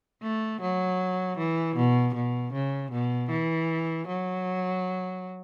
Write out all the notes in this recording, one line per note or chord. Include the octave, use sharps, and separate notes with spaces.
A3
F#3
E3
B2
B2
C#3
B2
E3
F#3